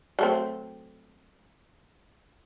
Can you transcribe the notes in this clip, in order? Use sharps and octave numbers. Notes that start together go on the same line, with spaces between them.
F#3 A3 C4